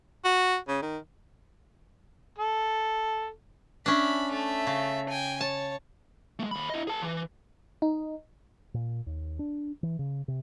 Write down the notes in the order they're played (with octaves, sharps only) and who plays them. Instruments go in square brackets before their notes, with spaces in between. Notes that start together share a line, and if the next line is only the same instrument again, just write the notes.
[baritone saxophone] F#4
C#3
D#3
[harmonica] A4
[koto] C#4 D4 [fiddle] E5 B5
[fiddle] A3 E5
[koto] C#3
[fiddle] G5 G#5
[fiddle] C#5 [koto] A5
[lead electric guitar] G#3 A3
D#2 B5
E4 D#5
G#4 A5
E3
[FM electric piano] D#4
[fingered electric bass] A#2
D#2
D4
E3
C#3
C3